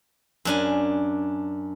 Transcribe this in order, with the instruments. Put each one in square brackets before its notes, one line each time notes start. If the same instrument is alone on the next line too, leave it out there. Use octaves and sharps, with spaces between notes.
[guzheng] F#2 D4 G#5